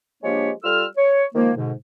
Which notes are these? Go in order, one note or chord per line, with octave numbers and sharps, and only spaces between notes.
F3 G#3 A#3 D4 G4 C#5
G3 F4 A4 E6 F6
C#5
D#3 F3 G#3 A#3
G#2 B2 D3